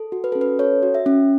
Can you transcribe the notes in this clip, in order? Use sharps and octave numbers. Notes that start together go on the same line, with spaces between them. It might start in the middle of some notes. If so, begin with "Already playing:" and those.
Already playing: A4
F#4
B4
C#4 A4
B4
A4 C#5
F#4
E5
C#4